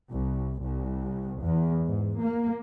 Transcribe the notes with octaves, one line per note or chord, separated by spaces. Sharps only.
C2
C2
E2
G#2
A#3